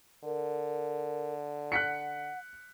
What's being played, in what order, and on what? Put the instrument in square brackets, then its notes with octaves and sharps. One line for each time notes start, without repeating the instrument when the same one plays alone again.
[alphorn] D3 [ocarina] A#4
[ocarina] F#5 [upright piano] F#6 B6 C#7